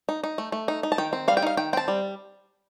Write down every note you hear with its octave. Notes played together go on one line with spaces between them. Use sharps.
D#4
D#4
A3
A3
D#4
D#4
A5
D#3 G5
C4
G3 F5
G5
D#4 F5
D#3 G5
C4 G5 A5
G3